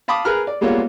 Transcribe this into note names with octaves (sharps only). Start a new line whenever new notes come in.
F5 A5 B5 D6 D#6
G#4 A#4 B4 F6 F#6
D5
G3 G#3 A#3 B3 F4 C#5